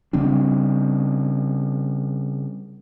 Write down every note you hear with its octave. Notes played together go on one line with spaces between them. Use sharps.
C#3 G3 C4 D4